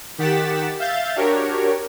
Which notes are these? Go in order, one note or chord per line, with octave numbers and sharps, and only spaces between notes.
D#3 G4 F#5 A6 B6 E7
E5 F5 G6 A6
D4 F#4 G4 A#4 C#5